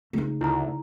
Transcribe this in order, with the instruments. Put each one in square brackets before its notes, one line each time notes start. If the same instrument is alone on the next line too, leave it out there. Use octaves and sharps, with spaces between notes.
[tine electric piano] C#3 [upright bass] A3 D#4
[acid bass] D2 [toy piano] E4 A#5